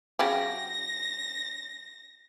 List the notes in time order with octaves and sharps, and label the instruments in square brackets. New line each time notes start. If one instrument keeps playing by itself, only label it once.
[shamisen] C#3 F#3 G4 [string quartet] A#6